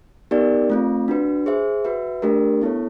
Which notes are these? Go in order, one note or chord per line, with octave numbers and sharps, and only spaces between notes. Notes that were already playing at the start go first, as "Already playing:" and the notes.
B3 D#4 G4 A#4 D5
A3 C4 F4
D4 F#4 B4
G#4 C5 E5
F#4 B4 E5
A3 D4 G4 A#4
B3 E4 A4 C#5